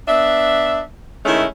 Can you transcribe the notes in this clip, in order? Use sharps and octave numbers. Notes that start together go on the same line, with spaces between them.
B3 D4 E5
D#3 G#3 A3 C#4 E4